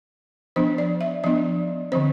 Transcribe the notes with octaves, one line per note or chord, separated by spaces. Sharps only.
F3 B3 D4 C5
D5
E5
F3 B3 D4 D5
D3 F3 C4 C5